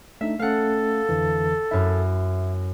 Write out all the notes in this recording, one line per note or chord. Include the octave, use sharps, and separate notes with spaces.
A3 D4 D#4 E5
A3 C#4 A4 F5 F#5
F2 D3 E3
F#2 E4 E5